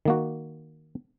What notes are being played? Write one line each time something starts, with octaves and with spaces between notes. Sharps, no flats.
D#3 A#3 F#4